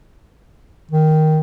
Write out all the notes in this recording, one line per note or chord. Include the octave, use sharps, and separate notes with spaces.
D#3